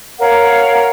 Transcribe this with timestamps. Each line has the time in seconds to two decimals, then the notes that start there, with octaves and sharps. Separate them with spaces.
0.20 A#4 C#5 F5 F#5